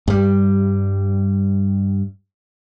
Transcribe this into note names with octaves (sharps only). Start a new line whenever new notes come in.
G2 G3